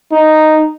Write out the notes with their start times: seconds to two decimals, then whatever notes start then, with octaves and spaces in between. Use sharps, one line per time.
0.12 D#4